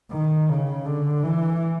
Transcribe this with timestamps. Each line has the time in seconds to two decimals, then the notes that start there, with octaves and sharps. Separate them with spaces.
0.12 D#3
0.49 C#3
0.86 D3
1.23 E3